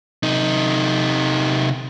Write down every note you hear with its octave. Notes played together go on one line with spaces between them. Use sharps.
C3 D#4